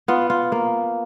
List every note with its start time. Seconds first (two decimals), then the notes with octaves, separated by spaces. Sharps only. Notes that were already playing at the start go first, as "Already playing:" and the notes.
0.08 B3 F4
0.30 F4
0.52 A#3